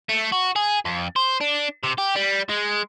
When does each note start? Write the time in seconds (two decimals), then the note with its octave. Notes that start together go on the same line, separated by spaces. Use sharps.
0.09 A3
0.32 F#4
0.56 G#4
0.85 F2
1.16 C5
1.41 D4
1.84 C3
1.98 G4
2.16 G3
2.50 G#3